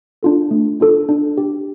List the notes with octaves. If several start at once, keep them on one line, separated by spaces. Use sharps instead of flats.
D4 F4 A4
A3
D4 F4 A4
D4
G4